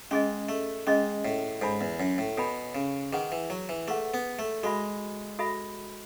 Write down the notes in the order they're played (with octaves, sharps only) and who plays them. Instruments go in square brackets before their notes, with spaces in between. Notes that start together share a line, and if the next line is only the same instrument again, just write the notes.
[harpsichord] G#3 [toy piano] C#4 G#4 D#5
[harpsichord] A3
[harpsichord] G#3 [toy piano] C#4 G#4 D#5
[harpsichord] A2
[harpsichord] G#2 [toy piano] A4 C#5 G#5 B5
[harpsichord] E2
F#2
A2
[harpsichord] B2 [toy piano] A4 C#5 G#5 B5
[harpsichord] C#3
[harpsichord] D#3 [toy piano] G#4 B4 F#5
[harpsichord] E3
F#3
E3
[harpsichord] A3 [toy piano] G#4 B4 F#5
[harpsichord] B3
A3
[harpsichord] G#3 [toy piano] F#4 A4 E5 B5
[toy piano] F#4 A4 E5 B5